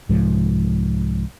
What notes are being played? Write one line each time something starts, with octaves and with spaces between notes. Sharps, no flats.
C2 G#2 F3